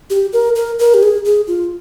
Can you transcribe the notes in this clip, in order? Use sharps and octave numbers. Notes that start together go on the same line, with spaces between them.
G4
A#4
A#4
A#4
G4
G#4
G#4
F4